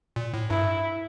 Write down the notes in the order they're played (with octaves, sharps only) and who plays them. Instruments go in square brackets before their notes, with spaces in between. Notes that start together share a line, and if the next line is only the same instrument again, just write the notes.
[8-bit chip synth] A#2
A2
[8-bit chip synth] G2 [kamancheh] E4